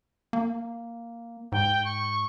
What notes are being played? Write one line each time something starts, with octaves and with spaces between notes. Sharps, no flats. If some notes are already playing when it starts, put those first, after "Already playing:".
A#3
G#2 G5
C#6